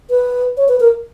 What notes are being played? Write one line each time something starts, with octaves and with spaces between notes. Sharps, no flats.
B4
C#5
B4
A#4